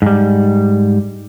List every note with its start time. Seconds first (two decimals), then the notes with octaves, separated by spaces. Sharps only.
0.02 G#2 G3